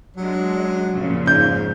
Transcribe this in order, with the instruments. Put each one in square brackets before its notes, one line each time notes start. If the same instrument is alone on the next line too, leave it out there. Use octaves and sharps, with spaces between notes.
[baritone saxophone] F#3 [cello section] G#3 D4
[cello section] F2 A#2 C#3
[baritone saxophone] G#2 [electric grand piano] G6